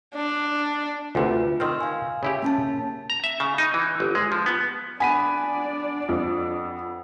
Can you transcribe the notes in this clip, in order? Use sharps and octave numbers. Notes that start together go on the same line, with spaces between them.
D4
D2 C3 F4 B4
D#3 C4 C6 E6 F6
F5 G#5
C#3 E4 G4
A#3 C#4 A5
A#5
E5
C#3
D#4
E3
G1
G#3
F3
B3
B3 D4 D5 G#5 B6 D#7
F2